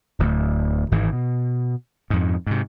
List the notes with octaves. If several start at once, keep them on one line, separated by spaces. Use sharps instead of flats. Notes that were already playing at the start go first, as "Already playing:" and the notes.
D1 D2
G#1 G#2 E3
B2
F2 G#2
G#2 C3